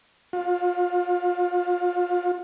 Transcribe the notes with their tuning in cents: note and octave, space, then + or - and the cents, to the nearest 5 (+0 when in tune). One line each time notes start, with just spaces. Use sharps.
F4 +25